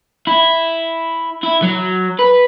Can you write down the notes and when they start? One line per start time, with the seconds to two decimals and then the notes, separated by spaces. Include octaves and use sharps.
0.27 E4
1.43 E4
1.63 F#3
2.19 B4